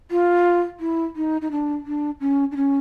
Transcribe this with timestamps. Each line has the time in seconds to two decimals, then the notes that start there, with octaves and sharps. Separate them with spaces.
0.11 F4
0.80 E4
1.16 D#4
1.41 D#4
1.51 D4
1.86 D4
2.20 C#4
2.51 D4
2.56 C#4